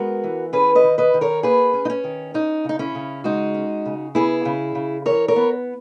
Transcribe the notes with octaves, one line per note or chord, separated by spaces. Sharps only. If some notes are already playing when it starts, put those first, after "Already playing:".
Already playing: G#3 B3 F#4 A#4
E3
C#4 G#4 B4
B4 D#5
D#3
B4 D#5
D#3
A#4 C#5
A#3 G#4 B4
C#4
D#4
C#4
D#3
C#4 D#4
C#3 D#4
C#4 E4
C#3
G#3 D#4 F#4
C#4
C#3
B3 E4 G#4
C#3
C#3
E3 A#4 C#5
A#4 C#5
B3